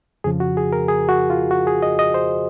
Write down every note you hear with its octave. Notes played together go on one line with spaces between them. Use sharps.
F2 C#3 F3 G#4
F#4
G#4
A#4
G#4
F#4
F4
F#4
G#4
D#5
D#5
C5